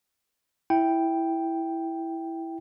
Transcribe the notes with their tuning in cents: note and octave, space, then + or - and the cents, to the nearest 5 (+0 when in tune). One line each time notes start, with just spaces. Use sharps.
E4 +0 G5 +0